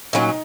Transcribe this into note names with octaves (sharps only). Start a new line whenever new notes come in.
A#2 F#3 C#4 D#4